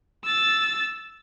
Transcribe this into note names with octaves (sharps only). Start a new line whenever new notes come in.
E6 A6